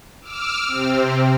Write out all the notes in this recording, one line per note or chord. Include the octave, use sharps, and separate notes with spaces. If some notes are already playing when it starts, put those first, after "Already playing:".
D6 E6 F6
C3 C4